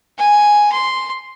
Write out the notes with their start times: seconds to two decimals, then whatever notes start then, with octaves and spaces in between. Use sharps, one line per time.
0.19 G#5
0.73 C6